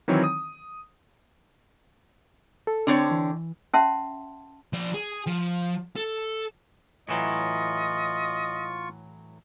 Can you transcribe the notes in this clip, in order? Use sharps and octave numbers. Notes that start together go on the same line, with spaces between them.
D#3 E3 F#3 C4 C#5
D#6
A4
D3 C4 D4 C#5
E3
C#4 E5 F#5 A5 C6
F3 D5
G#4
F3
A4
A2 E3 F#3 F4 D#5 C#6